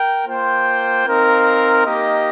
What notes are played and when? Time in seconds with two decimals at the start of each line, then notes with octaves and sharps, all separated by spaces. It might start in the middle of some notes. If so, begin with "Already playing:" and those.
Already playing: A#4 G5
0.26 A#3 F4 C5 G5
1.06 C4 D#4 A#4 F5
1.86 A#3 D#4 G4 D#5